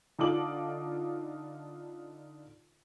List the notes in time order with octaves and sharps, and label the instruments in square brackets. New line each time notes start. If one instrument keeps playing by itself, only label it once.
[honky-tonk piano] D3 D#4 F4 A4 D6 F#7